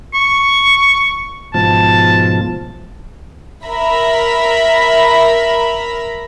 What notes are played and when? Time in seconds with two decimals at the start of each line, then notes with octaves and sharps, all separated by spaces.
0.14 C#6
1.54 G#2 B2 F3 A5
3.66 A#4 E5 A#5 B5